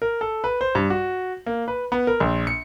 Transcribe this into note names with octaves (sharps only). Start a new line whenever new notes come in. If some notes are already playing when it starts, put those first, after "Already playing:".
A#4
A4
B4
C5
G2
F#4
A#3
B4
B3
A#4
A#1
C#7